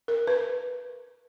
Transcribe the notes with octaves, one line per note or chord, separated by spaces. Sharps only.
A#4
B4